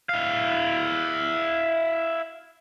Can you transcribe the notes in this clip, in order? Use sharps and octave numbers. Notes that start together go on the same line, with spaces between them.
E4 F5